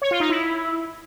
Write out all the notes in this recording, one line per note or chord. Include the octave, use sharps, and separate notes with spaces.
C#5
F4
D#4
E4